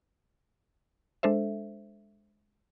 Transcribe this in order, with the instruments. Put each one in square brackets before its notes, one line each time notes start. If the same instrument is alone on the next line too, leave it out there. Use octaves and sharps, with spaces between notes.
[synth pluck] G#3 D4 A4 C5 E5